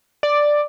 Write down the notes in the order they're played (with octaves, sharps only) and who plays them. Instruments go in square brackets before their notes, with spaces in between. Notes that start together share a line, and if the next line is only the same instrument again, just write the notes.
[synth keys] D5